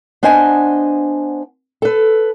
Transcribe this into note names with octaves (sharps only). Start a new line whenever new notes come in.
B3 D4 C5 D#5 G#5
A4 B4